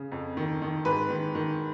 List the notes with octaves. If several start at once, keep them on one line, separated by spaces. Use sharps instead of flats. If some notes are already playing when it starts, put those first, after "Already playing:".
Already playing: C#3
F2
D#3
D#3
G#2 B4
D#3
D#3